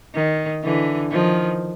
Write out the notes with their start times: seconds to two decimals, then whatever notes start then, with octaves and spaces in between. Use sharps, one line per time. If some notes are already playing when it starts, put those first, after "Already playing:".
0.15 D#3
0.63 D3 E3
1.11 D#3 F3